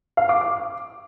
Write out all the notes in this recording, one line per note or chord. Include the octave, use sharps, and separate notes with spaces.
F5
D6
D6